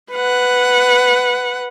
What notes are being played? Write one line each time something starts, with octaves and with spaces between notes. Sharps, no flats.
B4 F#5